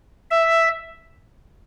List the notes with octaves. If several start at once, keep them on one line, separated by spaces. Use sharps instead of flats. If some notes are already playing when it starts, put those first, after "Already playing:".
E5